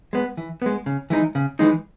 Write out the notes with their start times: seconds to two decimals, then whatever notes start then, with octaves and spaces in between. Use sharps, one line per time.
0.13 G#3 B3
0.37 E3
0.62 G#3 B3
0.86 C#3
1.10 E3 G#3 D#4
1.35 C#3
1.59 E3 G#3 D#4